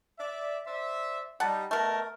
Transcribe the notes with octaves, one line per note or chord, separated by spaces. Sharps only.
D5 E5
C5 D5 E5
G3 D#4 F#5 A5
B2 A3 A#4